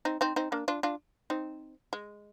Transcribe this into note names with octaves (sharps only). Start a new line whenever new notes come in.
C4 D#4
C4 D#4
C4 D#4
A#3 D4
D4 F4
D4 F4
C4 D#4
G#3